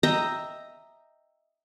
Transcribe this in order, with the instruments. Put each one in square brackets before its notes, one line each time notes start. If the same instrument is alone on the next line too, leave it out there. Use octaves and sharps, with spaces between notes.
[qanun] D#5 E5 G5 A#5